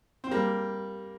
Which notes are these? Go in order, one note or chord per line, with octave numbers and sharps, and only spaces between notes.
C4
G3 A#3